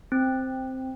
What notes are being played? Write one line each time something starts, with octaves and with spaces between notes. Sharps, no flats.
C4